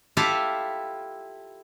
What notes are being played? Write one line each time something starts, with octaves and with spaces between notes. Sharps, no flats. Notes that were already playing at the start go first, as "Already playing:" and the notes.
E4 F4 G4 A4 E5 F5